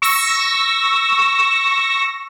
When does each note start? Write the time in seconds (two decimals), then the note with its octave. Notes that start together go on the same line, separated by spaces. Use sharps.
0.02 C#6 E6 A#6